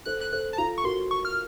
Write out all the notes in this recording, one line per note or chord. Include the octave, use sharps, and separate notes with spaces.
A4 C5 F#6
F#6
A4 C5 F#6
A5
F4 A4 A#5
C#6
F#4 A#4 C6
C#6
F6